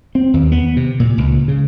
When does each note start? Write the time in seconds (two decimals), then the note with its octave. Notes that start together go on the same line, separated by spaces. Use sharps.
0.15 C4
0.34 D#2
0.52 B3
0.77 C3
1.00 A#2
1.18 C#2
1.48 C#3